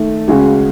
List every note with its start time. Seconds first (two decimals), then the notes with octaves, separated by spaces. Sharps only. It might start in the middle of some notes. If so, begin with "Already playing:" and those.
Already playing: D#3 A3
0.28 C#2 C#3 G#3 C#4 F#4